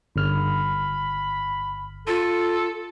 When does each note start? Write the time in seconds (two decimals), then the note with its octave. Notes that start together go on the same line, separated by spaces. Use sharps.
0.16 G1 B5 F6
2.07 F4 A4